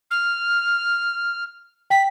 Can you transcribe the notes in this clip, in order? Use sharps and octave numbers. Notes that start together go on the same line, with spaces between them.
F6
G5 B6